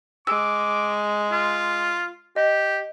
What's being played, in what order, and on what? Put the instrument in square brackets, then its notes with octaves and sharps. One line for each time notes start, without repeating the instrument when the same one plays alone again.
[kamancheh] G#3 [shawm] D6 [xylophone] E6
[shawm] F4
[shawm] G4 [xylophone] D#5